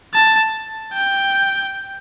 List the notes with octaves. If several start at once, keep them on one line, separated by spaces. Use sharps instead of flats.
A5
G5